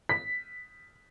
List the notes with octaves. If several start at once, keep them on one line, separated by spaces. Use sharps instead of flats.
B6